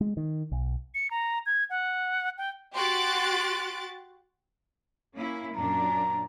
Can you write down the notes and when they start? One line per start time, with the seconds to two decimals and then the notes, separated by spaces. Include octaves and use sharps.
0.01 G#3
0.17 D#3
0.52 B1
0.95 C#7
1.11 A#5
1.46 G#6
1.70 F#5
2.38 G5
2.74 F#4 G4 C6 F#6 A6 D7
5.16 A#3 C#4 E4
5.56 F#2 A#2 D4 A#5